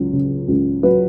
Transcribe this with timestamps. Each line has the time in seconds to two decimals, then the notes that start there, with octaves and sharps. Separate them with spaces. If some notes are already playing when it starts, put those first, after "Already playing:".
Already playing: C#2 F#3
0.13 C#3
0.48 C#2
0.83 F#3 B4